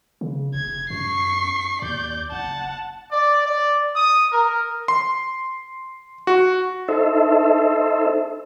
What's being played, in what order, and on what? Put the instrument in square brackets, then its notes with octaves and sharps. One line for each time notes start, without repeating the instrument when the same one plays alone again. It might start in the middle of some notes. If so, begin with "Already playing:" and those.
[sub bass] C#3
[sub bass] F1 [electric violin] G#6
[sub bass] F#2 [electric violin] C#6 C7
[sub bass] D#2 [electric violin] D5 G6
[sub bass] F#1 [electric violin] F#5 A5
[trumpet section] D5
D5
D#6
A#4
[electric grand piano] C6
F#4
[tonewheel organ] D#4 A4 C5 E5